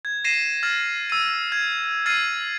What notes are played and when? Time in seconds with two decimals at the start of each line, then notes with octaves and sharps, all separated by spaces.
0.05 G#6
0.24 A#6 C7 D#7 E7
0.63 F6 A6
1.10 E6 D#7
1.52 G#6
2.06 F6 A6 C7 D#7